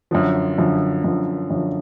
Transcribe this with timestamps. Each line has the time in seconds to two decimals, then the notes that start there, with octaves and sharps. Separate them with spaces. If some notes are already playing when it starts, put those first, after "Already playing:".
0.11 F#2 D3 F3
0.58 F#2 D3 F3
1.04 F#2 D3 F3
1.50 F#2 D3 F3